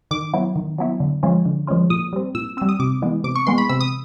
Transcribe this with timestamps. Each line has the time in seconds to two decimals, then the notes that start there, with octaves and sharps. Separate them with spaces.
0.11 D#3 D6
0.33 F#3 B3 E4
0.56 D#3
0.78 F#3 B3 E4
1.00 D3
1.23 F3 G#3 C#4 F4
1.45 D3
1.67 F3 G#3 C#4 F4
1.90 A#2 D#6
2.13 G3 C4
2.35 A#2 E6
2.57 G3 C4 E6
2.69 D#6
2.80 C3 D6
3.02 E3 G#3 B3
3.24 C3 D6
3.35 C#6
3.47 E3 G#3 B3 C6
3.58 B5
3.69 C3 E6
3.80 D#6